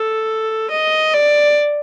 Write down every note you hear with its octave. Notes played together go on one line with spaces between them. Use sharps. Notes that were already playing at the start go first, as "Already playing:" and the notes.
Already playing: A4
D#5
D5